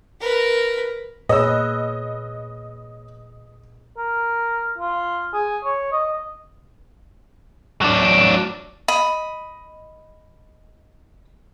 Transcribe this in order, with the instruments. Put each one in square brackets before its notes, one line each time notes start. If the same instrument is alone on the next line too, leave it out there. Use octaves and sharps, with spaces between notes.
[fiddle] A#4 B4
[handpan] A#2 G#4 B4 [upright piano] C#5 E6 [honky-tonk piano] D#5
[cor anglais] A#4
F4
G#4
C#5
D#5
[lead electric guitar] F#3 D4
[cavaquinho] D#5 B5